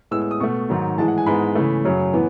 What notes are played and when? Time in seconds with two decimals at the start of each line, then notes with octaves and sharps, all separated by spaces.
0.11 A2 G#3 B3 E6
0.21 E6
0.31 D#6
0.40 B2 A3 C#6
0.69 G#2 D#3 F#3
0.98 A2 E3 G#3 A5
1.08 F#5
1.18 G#5
1.26 G#2 E3 G#3 B3 B5
1.55 C#3 E3 A3
1.85 F#2 C#3 F#3
2.13 A2 E3 B3